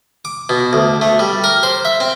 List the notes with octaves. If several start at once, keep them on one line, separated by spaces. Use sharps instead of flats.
D6
B2
D2
A3
G3
A#4
C5
E5
C4